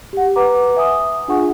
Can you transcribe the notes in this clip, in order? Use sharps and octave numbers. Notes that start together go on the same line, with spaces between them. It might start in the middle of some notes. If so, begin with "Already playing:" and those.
G4 F#5
B4 F#5 A#5 D6
E5 G#5 D#6
D4 F4 G#4 F#5 G#5 C#6